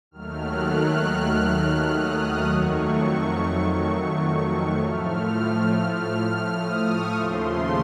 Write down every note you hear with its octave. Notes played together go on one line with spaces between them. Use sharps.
D#2 D#3 F#3 A3 F6
F#6
F6
D#6
F2 D#3 F#3 A3 C#6
A2 F3 A3 F6
F6
D#6
C#6
D#2 C#3 F3 A3 C6